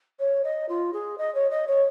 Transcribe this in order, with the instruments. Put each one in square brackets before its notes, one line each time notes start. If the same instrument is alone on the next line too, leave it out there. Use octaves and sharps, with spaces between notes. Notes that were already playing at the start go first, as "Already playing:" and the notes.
[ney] C#5
D#5
F4
G#4
D#5
C#5
D#5
C#5